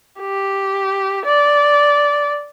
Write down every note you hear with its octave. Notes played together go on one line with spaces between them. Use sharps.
G4
D5